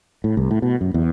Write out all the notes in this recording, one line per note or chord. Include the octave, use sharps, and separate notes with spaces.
A2
C2
A2
B2
F#2
E2